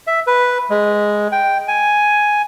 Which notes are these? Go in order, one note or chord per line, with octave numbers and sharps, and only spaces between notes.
E5
B4
G#3
G5
G#5